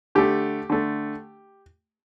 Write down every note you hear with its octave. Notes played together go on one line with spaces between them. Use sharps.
D3 A3 G4
D3 A3